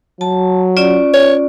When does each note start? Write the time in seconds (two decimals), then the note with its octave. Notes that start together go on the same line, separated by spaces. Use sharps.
0.21 F#3 A5
0.77 C#4 F4 D5
1.14 C#5